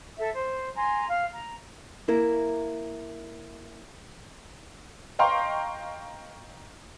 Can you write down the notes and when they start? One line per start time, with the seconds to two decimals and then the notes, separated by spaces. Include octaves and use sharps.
0.17 A4 E5
0.33 C5
0.74 G#5 A#5 C6
1.08 F5
1.32 A#5
2.08 A#3 E4 A#4
5.19 D#5 F5 G5 A#5 C6 C#6